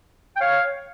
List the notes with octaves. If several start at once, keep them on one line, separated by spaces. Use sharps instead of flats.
G5
C#5 F5